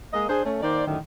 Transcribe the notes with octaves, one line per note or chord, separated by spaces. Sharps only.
G#3 A#3 D#5
D4 G#4 C5
A3 C#4
D#3 A#3 C5 D5
F#2 A2 D3 D#3